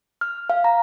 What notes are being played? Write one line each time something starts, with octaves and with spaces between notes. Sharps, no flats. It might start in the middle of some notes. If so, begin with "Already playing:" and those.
F6
F5
A#5